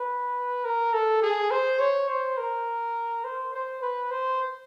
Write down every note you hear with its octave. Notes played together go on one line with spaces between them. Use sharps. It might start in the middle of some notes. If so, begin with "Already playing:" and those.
Already playing: B4
A#4
A4
G#4
C5
C#5
C5
A#4
C5
C5
B4
C5